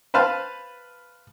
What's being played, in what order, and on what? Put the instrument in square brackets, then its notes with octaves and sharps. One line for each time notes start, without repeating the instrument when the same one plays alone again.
[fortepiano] B4 C5 F5 A5